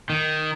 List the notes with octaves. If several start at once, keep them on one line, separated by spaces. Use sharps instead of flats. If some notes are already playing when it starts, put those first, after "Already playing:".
D#3